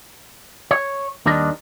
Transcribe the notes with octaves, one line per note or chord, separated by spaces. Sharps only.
C#5
D#2 D#3 G3 D4 D#5